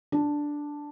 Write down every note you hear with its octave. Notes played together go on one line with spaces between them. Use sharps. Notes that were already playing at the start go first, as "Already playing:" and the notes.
D4